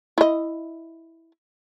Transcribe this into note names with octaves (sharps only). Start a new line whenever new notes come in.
E4 D#5